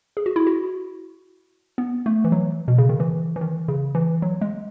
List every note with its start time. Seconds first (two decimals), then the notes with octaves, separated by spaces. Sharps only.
0.17 G#4
0.26 F#4
0.36 E4
0.47 F#4
1.78 B3
2.06 A3
2.24 E3
2.32 F#3
2.68 B2
2.78 C#3
2.89 D#3
3.00 E3
3.36 E3
3.41 D#3
3.68 C#3
3.95 E3
4.22 F#3
4.41 G#3